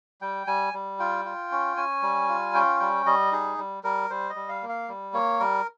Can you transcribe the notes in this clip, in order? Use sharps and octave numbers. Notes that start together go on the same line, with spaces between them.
G3 G5
G3 G#5
G3
F4 G5
F4
C#4
C#4 G#5
G3
F4
C#4 G5
G3 G5
G3 D#5
D#4 G#4
G3
G3 A#4
G3 C5
D#5
G3
F5
A#3
F5
G3
A#3 C#5
G3 A#4